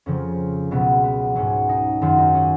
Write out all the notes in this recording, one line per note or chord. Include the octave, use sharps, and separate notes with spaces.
F2 C#3 F3 C#4
C#2 B2 F#3 B3
B3
G#2 F#3 C#4
D#4
F#2 D#3 F#3 F4
D#4
C#4